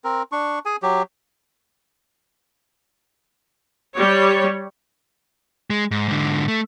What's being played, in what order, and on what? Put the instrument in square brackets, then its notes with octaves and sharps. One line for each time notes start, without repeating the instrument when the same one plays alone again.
[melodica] C4 A#4
D4 C#6
G#4 G#5
F#3 G4
[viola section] G3 C#5
[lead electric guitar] G#3
G#2
G#2 D3
A3